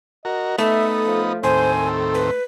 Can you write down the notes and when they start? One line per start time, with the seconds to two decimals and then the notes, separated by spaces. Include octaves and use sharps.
0.25 F#4 A#4 D#5
0.58 A3 B3 D#4 A4 E5
1.06 F3
1.43 D#2 A2 C4 C5 G#5
1.84 A4
2.14 B4